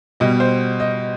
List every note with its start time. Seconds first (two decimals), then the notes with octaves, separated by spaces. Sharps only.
0.20 B2 G3 D#5
0.40 C5
0.80 D#5